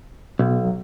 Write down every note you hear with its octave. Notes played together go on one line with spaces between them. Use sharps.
B1 B2
F#3